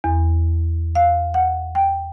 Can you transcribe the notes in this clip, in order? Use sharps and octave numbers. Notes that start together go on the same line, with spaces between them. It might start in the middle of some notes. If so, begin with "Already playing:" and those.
E2
F5
F#5
G5